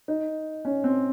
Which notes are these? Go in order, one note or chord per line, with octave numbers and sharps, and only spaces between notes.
D#4
C#4
C4